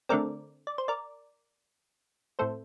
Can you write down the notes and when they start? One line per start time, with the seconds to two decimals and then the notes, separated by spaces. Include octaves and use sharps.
0.09 D3 A3 C4 A#4 D5
0.67 D5
0.78 C5
0.88 A#4 D5
2.39 A2 A3 C4 A4 C5